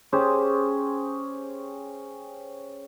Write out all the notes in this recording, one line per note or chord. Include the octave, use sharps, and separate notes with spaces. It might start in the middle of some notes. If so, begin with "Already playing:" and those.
C#4 G4 G#4 C5